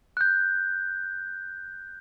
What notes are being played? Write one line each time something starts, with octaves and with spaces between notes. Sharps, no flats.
F#6 G6